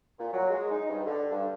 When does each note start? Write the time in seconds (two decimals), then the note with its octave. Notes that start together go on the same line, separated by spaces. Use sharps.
0.19 A#2
0.32 F#3
0.50 G#3
0.70 D#4
0.89 G2
1.06 D3
1.30 G2